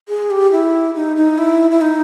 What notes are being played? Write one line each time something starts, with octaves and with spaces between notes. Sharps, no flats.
G#4
G4
E4
D#4
D#4
E4
E4
D#4